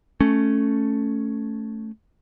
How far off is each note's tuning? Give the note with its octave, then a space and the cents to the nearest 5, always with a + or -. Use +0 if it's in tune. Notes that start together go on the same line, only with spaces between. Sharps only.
A3 +0 C#4 +0